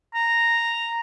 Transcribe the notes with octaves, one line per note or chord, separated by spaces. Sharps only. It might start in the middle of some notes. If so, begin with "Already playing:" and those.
A#5